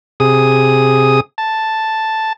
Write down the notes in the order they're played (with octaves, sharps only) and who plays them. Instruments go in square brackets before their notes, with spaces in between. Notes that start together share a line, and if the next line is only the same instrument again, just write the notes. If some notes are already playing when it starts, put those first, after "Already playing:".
[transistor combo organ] C3 G#4 D#6
A5